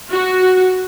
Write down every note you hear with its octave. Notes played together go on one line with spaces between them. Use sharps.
F#4